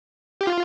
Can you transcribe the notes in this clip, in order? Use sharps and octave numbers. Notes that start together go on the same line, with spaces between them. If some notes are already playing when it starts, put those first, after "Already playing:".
G4
F4